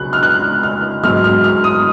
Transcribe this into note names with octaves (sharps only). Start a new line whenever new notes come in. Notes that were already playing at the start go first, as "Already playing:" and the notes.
Already playing: C#2 C#3 F#3 F#6
F6
F#6
F6
G#2 F#3 F6
F6
F6
D#6